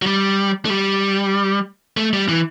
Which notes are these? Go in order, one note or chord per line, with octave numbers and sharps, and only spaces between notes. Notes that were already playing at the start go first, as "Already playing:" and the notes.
F#3
G3
A3
G3
A3
G3
E3